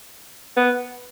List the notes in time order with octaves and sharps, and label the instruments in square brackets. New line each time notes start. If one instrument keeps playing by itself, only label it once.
[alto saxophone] B3